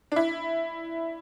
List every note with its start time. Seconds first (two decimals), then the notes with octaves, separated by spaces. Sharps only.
0.12 D4
0.16 E4